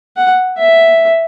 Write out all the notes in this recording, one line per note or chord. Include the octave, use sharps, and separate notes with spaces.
F#5
E5